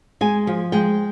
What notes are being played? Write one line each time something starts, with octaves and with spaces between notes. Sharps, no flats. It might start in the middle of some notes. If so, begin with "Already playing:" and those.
G#3 G#5
F3
G#3 G5